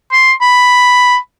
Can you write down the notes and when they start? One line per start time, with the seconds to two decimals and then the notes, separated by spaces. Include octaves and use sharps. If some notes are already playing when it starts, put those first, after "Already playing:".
0.12 C6
0.41 B5